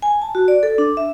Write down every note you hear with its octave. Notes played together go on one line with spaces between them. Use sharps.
G#5
A5
F#4
D5
A4
D4
E5